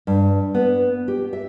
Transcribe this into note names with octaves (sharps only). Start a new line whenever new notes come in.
G2
B3
G4
E5